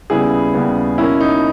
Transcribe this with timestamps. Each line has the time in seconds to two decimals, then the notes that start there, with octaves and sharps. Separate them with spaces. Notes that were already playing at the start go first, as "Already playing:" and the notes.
0.10 D#2 C#3 G3 B3 E4 G#4
0.54 D#2 C#3 G3 B3
0.98 B2 A#3 C#4 E4
1.20 D#4